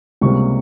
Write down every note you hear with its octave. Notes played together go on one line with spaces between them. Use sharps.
C#2 C3 G3 A#3 C#6